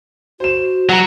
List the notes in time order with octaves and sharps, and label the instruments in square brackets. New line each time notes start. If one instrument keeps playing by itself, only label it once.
[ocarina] F#4 [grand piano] C5 E7
[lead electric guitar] F#3 [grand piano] F#4 A#5